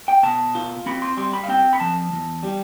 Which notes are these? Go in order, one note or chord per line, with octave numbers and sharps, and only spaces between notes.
G5
B2 A5
F4
C4 B5
C6
G3 C6
B5
F5
C4 G5
B5
F3 A5
E2
G3